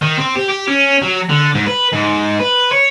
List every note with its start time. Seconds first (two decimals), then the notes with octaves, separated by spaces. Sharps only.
0.02 D#3
0.17 C4
0.35 G4
0.49 G4
0.67 C#4
1.02 F#3
1.29 D3
1.55 G#2
1.66 B4
1.92 G#2
2.40 B4
2.72 C#5